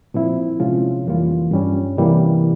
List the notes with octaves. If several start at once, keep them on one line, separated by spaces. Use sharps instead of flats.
A#2 F3 C4 E4
C3 F3 G#3 C#4 F4
F2 E3 G3 A#3 F4
G2 G3 C#4
C3 E3 G3 A#3 E4